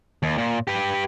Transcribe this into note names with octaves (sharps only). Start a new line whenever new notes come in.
D#2
A#2
G4 B4